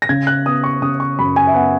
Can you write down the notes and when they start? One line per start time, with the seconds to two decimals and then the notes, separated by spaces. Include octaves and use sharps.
0.02 A#6
0.09 C#3 G#6
0.27 F#6
0.46 B3 D#6
0.64 C#6
0.82 C#3 D#6
1.00 C#6
1.19 F#2 B5
1.36 G#5
1.47 E5
1.54 B3 F#5